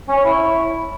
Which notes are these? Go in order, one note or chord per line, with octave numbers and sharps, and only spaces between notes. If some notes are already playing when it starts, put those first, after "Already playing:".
C#4
C#5
E4